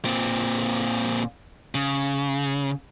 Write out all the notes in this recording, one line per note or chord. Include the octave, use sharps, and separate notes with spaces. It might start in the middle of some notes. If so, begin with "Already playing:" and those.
A#2 C4
C#3